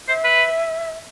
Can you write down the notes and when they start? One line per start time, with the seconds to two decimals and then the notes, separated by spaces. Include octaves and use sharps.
0.08 C5 E5
0.24 B4